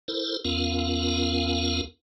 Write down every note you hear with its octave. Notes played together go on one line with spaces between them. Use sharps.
E4 A4 A#4 C5
E2 B3 C#4 F4 A#4 F5